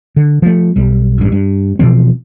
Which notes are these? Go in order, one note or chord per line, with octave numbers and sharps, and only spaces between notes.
D3
F3 A3
B1 G3
A1 G2
G2
B2 E3 F3 C4